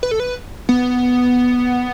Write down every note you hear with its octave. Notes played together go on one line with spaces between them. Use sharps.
B4
A4
B4
B3